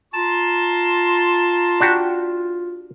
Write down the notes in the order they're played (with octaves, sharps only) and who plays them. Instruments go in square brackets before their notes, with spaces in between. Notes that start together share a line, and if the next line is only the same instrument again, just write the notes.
[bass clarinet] F4 [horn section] A5 A#5 C6
[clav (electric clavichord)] D4 F#4 G4